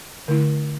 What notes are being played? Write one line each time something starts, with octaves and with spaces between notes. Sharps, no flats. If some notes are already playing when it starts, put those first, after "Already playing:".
D3 A3 E4